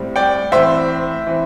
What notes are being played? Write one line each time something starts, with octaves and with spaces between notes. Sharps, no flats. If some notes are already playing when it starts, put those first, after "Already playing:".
Already playing: A2 G3 C4
D5 G5
A2 E3 C4 C5 E5
E3 C4